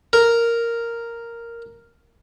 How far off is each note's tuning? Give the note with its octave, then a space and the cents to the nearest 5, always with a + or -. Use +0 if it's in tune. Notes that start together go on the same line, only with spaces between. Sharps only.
A#4 -5